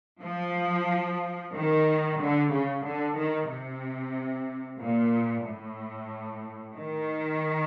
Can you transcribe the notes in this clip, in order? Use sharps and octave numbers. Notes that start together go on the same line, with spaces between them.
F3
D#3
D3
C#3
D3
D#3
C3
A#2
A2
D#3